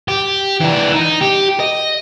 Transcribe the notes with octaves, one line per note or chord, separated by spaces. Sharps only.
G4
E3 D4
D#4
G4
D#5